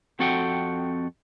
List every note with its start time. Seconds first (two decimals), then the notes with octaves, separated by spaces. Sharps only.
0.19 F2 C4 F#4 A4 F#5 G5